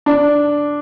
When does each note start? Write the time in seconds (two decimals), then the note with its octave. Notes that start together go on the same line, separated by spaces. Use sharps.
0.06 D4